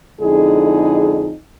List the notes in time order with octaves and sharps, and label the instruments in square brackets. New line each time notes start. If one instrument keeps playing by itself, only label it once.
[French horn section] F2 D3 G#3 D#4 E4 G#4